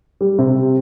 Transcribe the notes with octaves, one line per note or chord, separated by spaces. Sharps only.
G3
C3